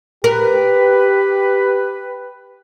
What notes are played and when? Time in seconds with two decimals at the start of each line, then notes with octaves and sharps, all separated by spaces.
0.24 G4 A#4 B4